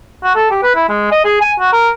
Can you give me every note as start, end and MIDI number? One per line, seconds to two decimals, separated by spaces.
0.24 0.34 66
0.35 0.47 69
0.51 0.61 67
0.62 0.73 71
0.75 0.88 64
0.89 1.08 56
1.12 1.24 75
1.25 1.37 68
1.41 1.52 80
1.60 1.72 66
1.73 1.90 70